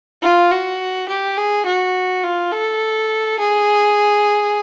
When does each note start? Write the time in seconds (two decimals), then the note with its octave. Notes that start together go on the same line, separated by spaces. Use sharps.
0.23 F4
0.51 F#4
1.09 G4
1.38 G#4
1.66 F#4
2.24 F4
2.52 A4
3.39 G#4